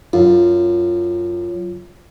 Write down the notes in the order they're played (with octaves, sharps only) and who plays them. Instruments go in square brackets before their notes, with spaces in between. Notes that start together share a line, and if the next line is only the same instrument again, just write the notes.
[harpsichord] F#2 [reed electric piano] F4